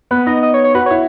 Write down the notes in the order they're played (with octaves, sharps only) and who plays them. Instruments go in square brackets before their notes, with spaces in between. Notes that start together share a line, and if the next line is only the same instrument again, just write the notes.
[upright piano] B3 [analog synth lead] B4
[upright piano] D#4 [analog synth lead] D#5
[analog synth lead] D#5
C#5
C#5
[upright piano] F#4 [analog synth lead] B4
[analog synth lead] C#5
[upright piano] E4